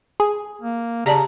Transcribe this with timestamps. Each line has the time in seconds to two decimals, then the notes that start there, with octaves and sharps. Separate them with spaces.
0.20 G#4
0.62 A#3
1.06 C#3 G4 D5 A5 A#5